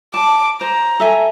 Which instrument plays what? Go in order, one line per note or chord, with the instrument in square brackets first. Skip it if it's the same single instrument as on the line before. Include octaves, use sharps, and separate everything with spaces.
[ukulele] A5 [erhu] D6
[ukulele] C5 [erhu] A#5
[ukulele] A4 E5 G#5